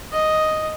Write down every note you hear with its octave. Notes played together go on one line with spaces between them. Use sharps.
D#5